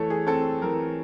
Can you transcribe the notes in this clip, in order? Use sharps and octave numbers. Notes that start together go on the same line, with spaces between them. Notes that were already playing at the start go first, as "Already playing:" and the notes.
Already playing: E3 A3 A4 C#5
G#4
C4 A4
E3 A#4